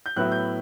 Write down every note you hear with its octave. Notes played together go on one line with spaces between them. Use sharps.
G6
A2 F#3 B3 E4 F#6
G6